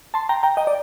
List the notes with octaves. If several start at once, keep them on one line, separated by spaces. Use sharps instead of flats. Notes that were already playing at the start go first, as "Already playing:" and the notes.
A5 C6
G5 A#5
G5 A#5
D#5 G5
D5